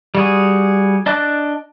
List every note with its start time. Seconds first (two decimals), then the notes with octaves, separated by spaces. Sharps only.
0.15 G3 F#4 G#4
1.06 D4 D#5 A5 D6 F#6